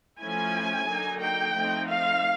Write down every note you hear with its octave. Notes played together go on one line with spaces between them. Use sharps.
F3 A3 C#4 E4 G#5
D3 F#3 A#3 D#4
G5
F3 A3 C4 D#4
F5